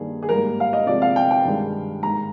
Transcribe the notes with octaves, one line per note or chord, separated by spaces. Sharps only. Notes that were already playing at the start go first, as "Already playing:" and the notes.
Already playing: G2 D#3 A#3 G#4
G#4
G#2 G3 A#3 A#4
F5
D#5
C3 F3 G#3 D5
F5
G5
G5
G2 D#3 G#3
G#2 D#3 G#3 A#5